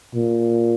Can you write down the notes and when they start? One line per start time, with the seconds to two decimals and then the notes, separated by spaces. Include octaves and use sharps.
0.14 A#2